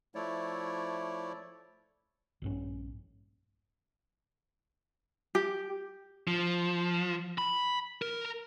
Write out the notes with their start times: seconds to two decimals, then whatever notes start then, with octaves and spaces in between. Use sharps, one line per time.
0.15 F3 A3 E4 C#5 D5
2.42 A#1 G2 C#4
5.35 G4
6.28 F3
7.38 B5
8.02 A#4